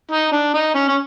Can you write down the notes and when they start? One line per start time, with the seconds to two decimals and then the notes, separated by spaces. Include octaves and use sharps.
0.11 D#4
0.32 D4
0.54 D#4
0.74 C#4
0.88 C#4